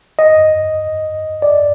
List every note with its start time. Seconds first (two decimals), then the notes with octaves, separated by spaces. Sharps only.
0.19 D#5
1.42 D5